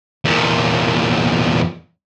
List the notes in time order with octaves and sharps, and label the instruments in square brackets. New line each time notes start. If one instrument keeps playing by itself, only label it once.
[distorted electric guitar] E2 A#2